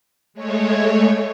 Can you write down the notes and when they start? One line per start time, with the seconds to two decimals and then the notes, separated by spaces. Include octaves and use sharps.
0.34 G#3 A3 C#5